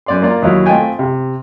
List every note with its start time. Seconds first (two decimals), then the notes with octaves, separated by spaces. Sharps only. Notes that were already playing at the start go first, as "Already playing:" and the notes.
0.06 F#2 D5 C6
0.22 A#3 F4 D5 A#5
0.42 D#2 F#3 E4
0.66 A3 C4 F4 D#5 G5 G#5
0.99 C3